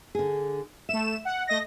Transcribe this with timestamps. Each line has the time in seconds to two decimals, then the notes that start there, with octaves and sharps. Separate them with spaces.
0.15 D3 G#4
0.89 A3 E5 E7
1.25 F#5
1.47 A3 D#5 A#6